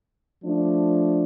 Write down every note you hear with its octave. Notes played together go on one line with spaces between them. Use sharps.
F3 A3 D4